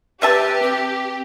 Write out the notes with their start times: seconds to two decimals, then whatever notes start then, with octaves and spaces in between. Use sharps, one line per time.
0.22 C3 G4 B4 E5 A5
0.62 C4